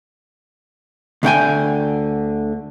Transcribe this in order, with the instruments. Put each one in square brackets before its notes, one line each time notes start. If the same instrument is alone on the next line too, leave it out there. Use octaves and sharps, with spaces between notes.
[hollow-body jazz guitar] D2 D3 G5 G#5